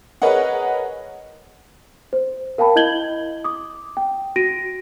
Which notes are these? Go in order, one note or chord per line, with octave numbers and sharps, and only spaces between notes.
G#4 A#4 B4 C#5 D#5 F#5
C5
A#4 F5 G5 A5 B5
E4 D#5 G6 G#6 F#7 G7
D6 D#6
G5
F#4 A#6 D7 D#7